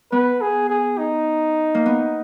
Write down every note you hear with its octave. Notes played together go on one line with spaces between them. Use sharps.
B3 B4
G#4
G#4
D#4
A#3
B3